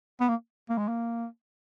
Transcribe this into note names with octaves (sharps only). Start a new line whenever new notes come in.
B3
A#3
A#3
G#3
A#3